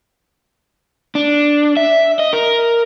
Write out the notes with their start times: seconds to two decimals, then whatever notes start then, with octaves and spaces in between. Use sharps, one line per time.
1.15 D4
1.77 E5
2.19 D#5
2.33 A#4